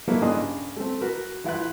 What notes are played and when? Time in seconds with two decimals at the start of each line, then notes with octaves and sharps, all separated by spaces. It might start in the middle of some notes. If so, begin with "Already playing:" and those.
0.08 F#3 A#3 D#4 E4 A4 B4
0.21 G2 C#3 D4 G#4 D#5 C6
0.77 A3 C4
1.01 F#4 A#4 B4
1.44 A1 E4 F4 B4 F#6